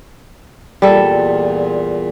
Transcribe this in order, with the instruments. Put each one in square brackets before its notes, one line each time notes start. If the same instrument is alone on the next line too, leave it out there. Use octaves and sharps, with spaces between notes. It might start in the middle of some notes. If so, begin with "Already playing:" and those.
[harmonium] E2 A#2 [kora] G3 A4